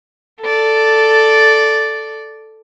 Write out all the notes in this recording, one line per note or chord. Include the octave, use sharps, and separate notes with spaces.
A4 D5